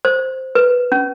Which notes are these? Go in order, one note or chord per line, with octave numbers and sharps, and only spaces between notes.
C5
B4
C#4